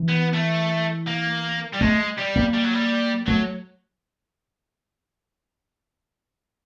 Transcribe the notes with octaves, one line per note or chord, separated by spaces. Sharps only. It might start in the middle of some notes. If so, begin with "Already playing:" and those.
Already playing: E3
B3
A3
A#3
G3
G#3 A3
G3
A#3
G3
F#3
G3
F#3 A3